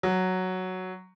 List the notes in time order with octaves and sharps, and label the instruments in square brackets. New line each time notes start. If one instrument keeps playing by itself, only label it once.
[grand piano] F#3